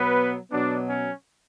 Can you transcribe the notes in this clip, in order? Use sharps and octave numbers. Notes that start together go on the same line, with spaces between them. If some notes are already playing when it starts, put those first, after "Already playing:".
Already playing: B2 F#3 B3 B4
B2 F#3 B3 D4
C#4